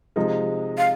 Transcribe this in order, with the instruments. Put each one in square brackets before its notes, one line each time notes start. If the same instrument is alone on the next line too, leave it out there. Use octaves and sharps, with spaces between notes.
[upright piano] C3 F3 G#3 D#4
[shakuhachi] F5